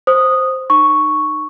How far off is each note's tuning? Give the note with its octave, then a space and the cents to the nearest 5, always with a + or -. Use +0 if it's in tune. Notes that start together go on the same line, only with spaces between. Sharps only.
C5 +0 D#6 -5
D#4 -25 C#6 +0